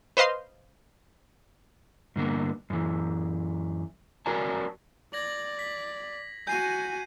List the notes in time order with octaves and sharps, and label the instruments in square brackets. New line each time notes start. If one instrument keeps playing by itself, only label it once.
[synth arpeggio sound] B4 C5 D#5 F5 C6
[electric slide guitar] G2 D3 A#3 B3
F#2 E3
F#3 F#4 A#4 D5 G#5 A5
[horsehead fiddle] D5 [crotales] G#6 A#6 F#7
[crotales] B6
[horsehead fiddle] F#4 G#5 [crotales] G6 C7 D#7